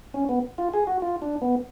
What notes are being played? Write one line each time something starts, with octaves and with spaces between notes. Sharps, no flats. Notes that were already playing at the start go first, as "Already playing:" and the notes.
C#4
B3
F4
G#4
F#4
F4
D4
B3